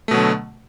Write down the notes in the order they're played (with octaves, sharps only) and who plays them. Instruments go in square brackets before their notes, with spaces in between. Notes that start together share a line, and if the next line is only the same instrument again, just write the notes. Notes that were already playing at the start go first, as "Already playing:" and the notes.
[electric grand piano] A3
B2
F#3
D3